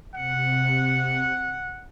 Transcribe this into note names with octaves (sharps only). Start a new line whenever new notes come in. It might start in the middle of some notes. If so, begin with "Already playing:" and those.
C3 F#5